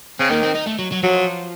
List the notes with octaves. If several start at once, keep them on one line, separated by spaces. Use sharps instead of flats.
C#3 C4
D#3 A#3
C4
D#4
A3
F#3
F#3
F3 F#3